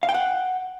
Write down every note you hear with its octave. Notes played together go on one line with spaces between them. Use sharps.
F5
G5
F#5